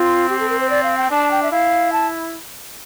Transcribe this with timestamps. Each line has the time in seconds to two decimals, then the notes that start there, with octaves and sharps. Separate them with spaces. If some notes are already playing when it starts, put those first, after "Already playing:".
Already playing: C4 F4
0.29 G4
0.40 A4
0.49 A#4
0.60 C5
0.70 D5
0.83 F5
0.97 G5
1.10 D4 A5
1.31 G5
1.43 E5
1.51 E4 F5
1.92 A5